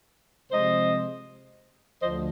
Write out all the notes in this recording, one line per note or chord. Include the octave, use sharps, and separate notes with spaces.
C3 F3 G#3 C5 D#5
D2 D3 F3 C5 D#5